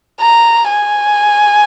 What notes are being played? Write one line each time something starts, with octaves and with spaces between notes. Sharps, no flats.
A#5
G#5